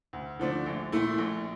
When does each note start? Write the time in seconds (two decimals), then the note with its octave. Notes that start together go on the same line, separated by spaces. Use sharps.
0.13 D2
0.39 D3 F3 A3 D4
0.66 A#1
0.92 A#2 A3 E4
1.18 A#1